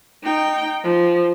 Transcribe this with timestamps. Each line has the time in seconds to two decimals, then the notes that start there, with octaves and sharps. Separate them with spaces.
0.23 D#4 G5
0.83 F3